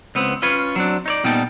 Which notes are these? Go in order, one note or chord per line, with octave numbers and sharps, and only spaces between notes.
C#2 B3 C4
C#4 F4 B4 C#5
F#3 C4 D4
D#4 C#5 D5
A#2 G3 B3 D#4 G5 A5